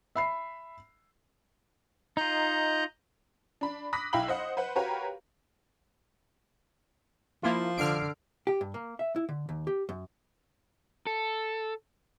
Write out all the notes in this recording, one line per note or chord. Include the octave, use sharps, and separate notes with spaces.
E5 B5 C7
D#4 F4 D#5 A#5 G6
D4 B5
B5 D6 D#6 F#6 A#6 B6
B1 E4 F5 G5 B5 F#7
C5 D#5 F#5
B4 C5 F#5
F#4 G4 A#4 B4 C#5 F5
F3 A#3 E4 F4
D3 F6 C7 D7
G4
G2
A#3
E5
E4
D3
D#2
G4
F#2
A4